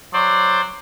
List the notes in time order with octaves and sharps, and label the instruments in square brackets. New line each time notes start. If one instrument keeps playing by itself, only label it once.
[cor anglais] F#3 [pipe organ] C5 D5